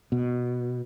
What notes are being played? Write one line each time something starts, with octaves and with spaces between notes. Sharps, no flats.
B2